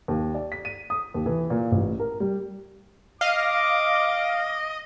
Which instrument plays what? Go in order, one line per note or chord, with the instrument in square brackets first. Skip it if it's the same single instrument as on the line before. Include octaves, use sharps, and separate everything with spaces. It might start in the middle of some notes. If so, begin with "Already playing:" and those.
[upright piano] D#2
D5
B6
D#7
D#6
D#2
E3
A#2
A1
A#4
G3
[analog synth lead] D#5 [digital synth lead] F5 [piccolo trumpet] D6